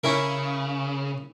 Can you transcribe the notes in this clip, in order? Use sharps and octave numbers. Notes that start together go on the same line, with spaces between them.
C#3 C#4 E4 A#4